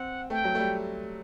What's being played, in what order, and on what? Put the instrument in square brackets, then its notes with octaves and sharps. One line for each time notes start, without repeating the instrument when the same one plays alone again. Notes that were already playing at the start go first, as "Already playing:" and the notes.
Already playing: [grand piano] C4 [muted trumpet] F#5
[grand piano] A3 [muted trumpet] G5
[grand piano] F#3
A3
G3